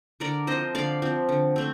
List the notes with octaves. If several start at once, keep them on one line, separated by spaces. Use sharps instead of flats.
D3 A#4 D5
F3 C4 C5 D#5
D3 D5 F5
F3 C4
D3
A3 C4